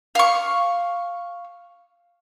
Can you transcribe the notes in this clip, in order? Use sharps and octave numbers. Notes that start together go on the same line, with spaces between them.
F5 C#6